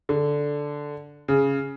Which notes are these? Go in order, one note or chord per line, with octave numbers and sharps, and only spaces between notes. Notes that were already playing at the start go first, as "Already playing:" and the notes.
D3
C#3